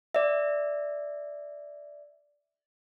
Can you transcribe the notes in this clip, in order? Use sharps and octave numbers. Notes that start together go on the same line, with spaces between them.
D5 E5